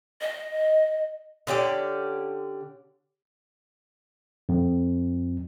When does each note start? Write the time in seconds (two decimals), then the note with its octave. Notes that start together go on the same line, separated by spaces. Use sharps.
0.21 D#5
1.47 D3 C#4 G4 D5
4.49 F2